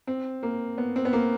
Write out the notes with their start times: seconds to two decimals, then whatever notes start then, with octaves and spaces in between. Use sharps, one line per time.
0.07 C4
0.43 A#3
0.78 B3
0.96 C4
1.05 B3
1.13 A#3